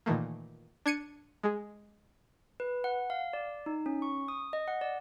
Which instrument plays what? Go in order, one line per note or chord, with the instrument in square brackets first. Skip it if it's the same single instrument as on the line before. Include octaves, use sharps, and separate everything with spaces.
[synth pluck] A#2 D#3 E3 A3 A#3
D4 G#6 C#7 D#7
G#3 G#4
[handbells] B4
F#5
F5
D5
D#4
C#4
C#6
D#6
D#5
F#5
D5